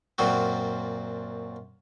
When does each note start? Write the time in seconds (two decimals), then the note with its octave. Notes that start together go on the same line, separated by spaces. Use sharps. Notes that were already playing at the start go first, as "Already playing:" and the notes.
0.18 F#2 A#2 C4 F#4